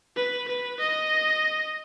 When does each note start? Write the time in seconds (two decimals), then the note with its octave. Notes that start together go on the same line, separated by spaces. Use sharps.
0.16 B4
0.48 B4
0.80 D#5